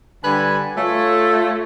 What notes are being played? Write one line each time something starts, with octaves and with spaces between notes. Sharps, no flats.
D3 G3 B4 G#5 B5
A3 F4 A4 C#5